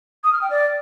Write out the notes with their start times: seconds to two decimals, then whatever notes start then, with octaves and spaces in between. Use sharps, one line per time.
0.24 D#6
0.33 F6
0.41 G5
0.50 D5